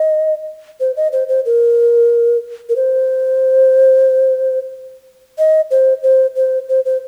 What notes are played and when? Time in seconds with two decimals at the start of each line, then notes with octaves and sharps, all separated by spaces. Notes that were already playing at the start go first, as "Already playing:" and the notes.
Already playing: D#5
0.80 C5
0.96 D#5
1.12 C5
1.29 C5
1.45 A#4
2.69 A#4
2.76 C5
5.38 D#5
5.71 C5
6.03 C5
6.36 C5
6.69 C5
6.85 C5